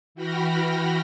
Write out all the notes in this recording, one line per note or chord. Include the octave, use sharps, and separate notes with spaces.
E3 F#4 G5 B5 F6 A#6